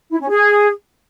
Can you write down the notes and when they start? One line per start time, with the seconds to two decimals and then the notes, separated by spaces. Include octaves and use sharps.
0.11 E4
0.20 C#4
0.29 G#4